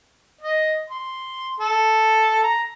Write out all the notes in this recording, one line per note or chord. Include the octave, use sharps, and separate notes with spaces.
D#5
C6
A4
A#5